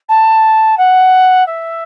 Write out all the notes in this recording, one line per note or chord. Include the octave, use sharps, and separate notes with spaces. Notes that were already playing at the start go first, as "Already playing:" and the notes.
A5
F#5
E5